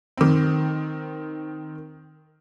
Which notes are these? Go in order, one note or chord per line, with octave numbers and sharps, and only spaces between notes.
D#3 C4